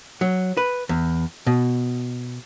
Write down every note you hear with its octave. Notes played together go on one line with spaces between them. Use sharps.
F#3
B4
E2
B2